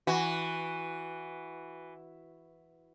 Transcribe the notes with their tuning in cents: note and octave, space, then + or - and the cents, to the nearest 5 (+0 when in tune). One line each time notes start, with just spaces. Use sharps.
E3 +0 F#4 +0